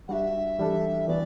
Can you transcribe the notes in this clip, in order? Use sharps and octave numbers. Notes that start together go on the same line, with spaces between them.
G3 D4 F#4 E5 F#5
E3 G3 D4 A4
E3 B3 F#4 D5